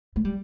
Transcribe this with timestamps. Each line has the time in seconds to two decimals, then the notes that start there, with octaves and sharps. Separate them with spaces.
0.16 A3
0.25 G3